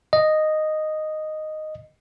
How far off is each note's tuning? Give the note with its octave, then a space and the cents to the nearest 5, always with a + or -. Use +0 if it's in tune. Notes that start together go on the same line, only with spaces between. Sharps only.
D#5 -5